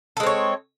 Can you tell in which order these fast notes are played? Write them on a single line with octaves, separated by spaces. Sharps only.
A4 G#3 C4 C#5